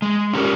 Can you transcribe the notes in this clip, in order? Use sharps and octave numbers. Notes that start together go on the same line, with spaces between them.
G#3
C#4 G4 A#4